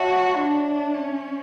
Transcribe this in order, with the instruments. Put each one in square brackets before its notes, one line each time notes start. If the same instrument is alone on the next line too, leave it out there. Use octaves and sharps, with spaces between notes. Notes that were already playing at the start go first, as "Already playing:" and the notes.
Already playing: [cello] F#4 [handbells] C#5 E5 A5
[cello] D4
C#4